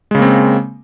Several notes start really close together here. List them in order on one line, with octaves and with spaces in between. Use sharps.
G#3 C#3 A#3 C4